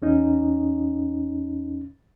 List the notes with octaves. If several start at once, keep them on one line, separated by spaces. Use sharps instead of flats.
E2 C#4 D#4